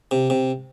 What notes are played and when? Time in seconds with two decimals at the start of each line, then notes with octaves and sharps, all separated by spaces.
0.11 C3
0.30 C3